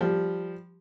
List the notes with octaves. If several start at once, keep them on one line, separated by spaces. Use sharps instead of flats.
F3 G3